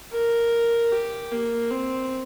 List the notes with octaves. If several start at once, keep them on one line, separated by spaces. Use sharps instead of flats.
A#4
G4
A#3
C4